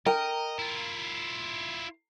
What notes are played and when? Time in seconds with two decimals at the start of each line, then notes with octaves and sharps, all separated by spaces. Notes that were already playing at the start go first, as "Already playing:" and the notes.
0.06 A#4 D#5 G5
0.59 E4 F4